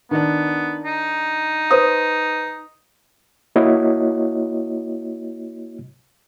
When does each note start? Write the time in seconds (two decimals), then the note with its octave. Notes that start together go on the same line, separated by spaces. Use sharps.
0.11 D#3 B3 D4
0.85 D#4
1.71 B4 C5 D#6
3.56 A#3 E4 F#4 C#5 D#5